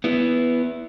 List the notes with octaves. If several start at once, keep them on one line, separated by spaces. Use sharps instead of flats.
B3 E4